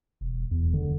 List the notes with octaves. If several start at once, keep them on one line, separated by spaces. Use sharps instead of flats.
E1
E2
D3